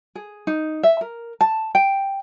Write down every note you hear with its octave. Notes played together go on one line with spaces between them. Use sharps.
G#4
D#4
E5
A#4
A5
G5